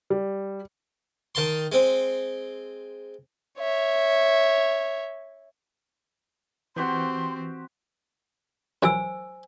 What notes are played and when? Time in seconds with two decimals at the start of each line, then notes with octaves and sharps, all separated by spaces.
0.10 G3
1.35 D#3 A5 C6
1.72 G#3 C4
3.59 C#5 E5
6.76 E3 C4 F#4 G4 C5 C6
8.83 F#2 E3 C5 G#5 E6